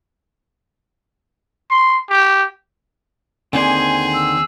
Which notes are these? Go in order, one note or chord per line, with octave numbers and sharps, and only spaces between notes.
C6
G4
D#2 D3 D#3 C4 G#4 C5 D5 G#5
E6